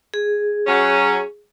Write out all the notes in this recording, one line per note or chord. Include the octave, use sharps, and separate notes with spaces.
G#4
F#3 C#4